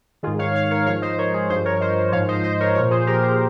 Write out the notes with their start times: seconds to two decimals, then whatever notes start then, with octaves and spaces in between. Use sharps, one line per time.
0.23 D#3 F4 G#4
0.27 G#2
0.39 C#5 F5
0.55 C#5 F5
0.71 A#4 C#5
0.86 G#2 F3 C#5 F5
1.02 C5 D#5
1.18 A#4 C#5
1.33 G#4 C5
1.50 G2 F3 G#4 C5
1.65 A#4 C#5
1.81 C5 D#5
2.12 G#2 F3 C#5 F5
2.28 C5 D#5
2.43 C5 D#5
2.60 A#4 C#5
2.75 A#2 F3 A#4 C#5
2.91 G#4 C5
3.07 G4 A#4
3.22 G#4 C5